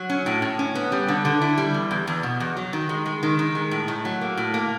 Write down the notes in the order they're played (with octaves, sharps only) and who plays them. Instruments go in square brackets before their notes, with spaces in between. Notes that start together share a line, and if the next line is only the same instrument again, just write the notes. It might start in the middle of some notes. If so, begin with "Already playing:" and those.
Already playing: [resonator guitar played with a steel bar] F#3
C#4
A2
A2
C#4
B3
G3
D3
D3
E4
G3
E2
E2
E2
B2
E2
F#3
D#3
G#3
G#3
D#3
D#3
G#3
A2
A2
F#3
A#3
A2
A#3